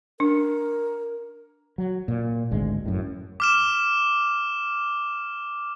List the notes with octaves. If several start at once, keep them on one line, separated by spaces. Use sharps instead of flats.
D4 A#4
F#3
A#2
G#1 D2 G#3
F#2 A2
D6 F6 E7